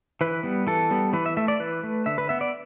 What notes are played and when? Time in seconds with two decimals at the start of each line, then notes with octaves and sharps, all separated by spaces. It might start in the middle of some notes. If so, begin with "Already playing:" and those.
0.21 E3 B4
0.43 G3 B3
0.67 E3 A4
0.91 G3 B3
1.13 E3 B4
1.26 E5
1.37 A3 E5
1.48 D5
1.60 E3 B4
1.83 A3
2.06 D3 E5
2.18 B4
2.29 B3 E5
2.41 D5